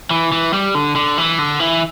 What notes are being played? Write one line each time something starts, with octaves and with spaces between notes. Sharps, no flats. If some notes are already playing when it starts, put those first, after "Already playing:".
E3
E3
G3
D3
D3
E3
D3
E3